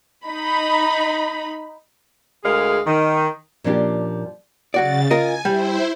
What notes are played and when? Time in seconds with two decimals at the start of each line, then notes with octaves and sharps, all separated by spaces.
0.25 D#4 B5
2.44 D2 G#3 G#4 A#4 F5
2.86 D#3
3.64 A#2 F3 C#4 D4 F4 G4
4.74 C#3 F#3 F#4 D5 A6
5.10 F4 A#4 D#5 G#5
5.45 G3 E4 C5